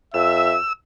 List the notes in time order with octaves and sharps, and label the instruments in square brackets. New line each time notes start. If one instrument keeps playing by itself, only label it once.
[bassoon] F2 [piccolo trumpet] E5 [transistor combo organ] E6